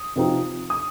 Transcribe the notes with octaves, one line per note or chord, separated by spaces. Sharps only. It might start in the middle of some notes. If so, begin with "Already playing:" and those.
Already playing: D#6
C3 F3 C4 D#4
D#6